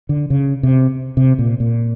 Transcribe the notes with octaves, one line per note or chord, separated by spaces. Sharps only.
D3
C#3
C3
C3
A#2
A#2